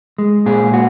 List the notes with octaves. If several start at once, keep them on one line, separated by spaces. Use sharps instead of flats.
G#3
A#2 G#4
F#4